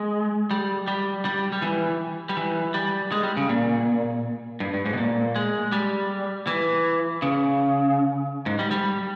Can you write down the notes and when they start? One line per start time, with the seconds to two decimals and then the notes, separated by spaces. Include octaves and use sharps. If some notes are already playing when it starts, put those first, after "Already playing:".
Already playing: G#3
0.51 G3
0.88 G3
1.25 G3
1.52 G3
1.62 E3
2.29 G3
2.37 E3
2.74 G3
3.12 G#3
3.23 G3
3.37 C#3
3.49 A#2
4.60 G2
4.74 G2
4.86 G#2
4.93 B2
4.98 A#2
5.36 G#3
5.72 G3
6.47 E3
7.22 C#3
8.46 G#2
8.59 G3
8.71 G3